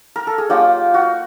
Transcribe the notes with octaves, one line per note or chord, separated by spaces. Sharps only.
A#4
A4
G#4
F#3 A#3 D#4 F4 G4
F#4